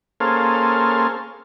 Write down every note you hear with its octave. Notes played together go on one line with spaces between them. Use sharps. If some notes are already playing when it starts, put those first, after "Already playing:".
A#3 C#4 G#4 A4 C5 F5